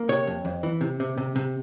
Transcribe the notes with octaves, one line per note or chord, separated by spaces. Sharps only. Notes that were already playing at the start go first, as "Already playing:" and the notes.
Already playing: A#3
C3 C#5
F2
F2
E3
C3
C3
C3
C3